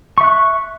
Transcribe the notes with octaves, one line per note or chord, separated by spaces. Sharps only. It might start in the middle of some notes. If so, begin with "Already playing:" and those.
E5 C#6 F#6